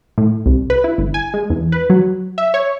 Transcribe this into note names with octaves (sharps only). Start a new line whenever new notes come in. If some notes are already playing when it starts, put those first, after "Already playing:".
A2
C2
B4
E4
G1
G#5
G#3
E2
B4
F#3
E5
C#5